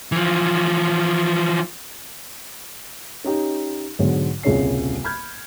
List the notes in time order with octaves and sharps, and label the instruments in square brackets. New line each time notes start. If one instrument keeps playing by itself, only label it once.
[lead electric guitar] E3 F3
[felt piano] C#4 D#4 G4
B1 G#2 D3 F#3 C#5
D#1 C2 C#3 C#5 C7
B5 F6 G6 G#6